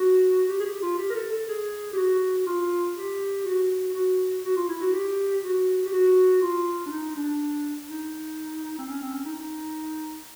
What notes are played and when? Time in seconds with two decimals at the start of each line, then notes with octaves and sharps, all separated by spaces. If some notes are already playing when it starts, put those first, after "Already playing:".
Already playing: F#4
0.49 G4
0.60 G#4
0.66 G4
0.82 F4
0.98 G4
1.10 A#4
1.15 A4
1.31 A4
1.48 G#4
1.93 G4
1.97 F#4
2.46 F4
2.96 G4
3.46 F#4
3.95 F#4
4.44 F#4
4.56 F4
4.69 E4
4.81 F#4
4.94 G4
5.43 F#4
5.86 G4
5.93 F#4
6.41 F4
6.86 D4
6.91 D#4
7.16 D4
7.90 D#4
8.78 C4
8.89 C#4
9.01 C4
9.13 C#4
9.25 D#4
9.38 D#4